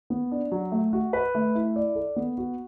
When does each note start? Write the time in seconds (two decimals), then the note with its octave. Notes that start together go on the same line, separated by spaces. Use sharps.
0.10 B3
0.31 D4
0.52 F#3
0.72 A3
0.93 F#4
1.13 B4
1.35 A3
1.55 E4
1.76 D5
1.95 A4
2.16 B3
2.38 F#4